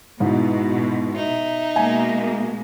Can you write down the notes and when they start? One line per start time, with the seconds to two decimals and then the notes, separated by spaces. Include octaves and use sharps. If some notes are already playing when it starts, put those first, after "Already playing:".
0.20 G#2 B2 E4
1.16 D#4 E5
1.76 B2 G#3 A#3 G#5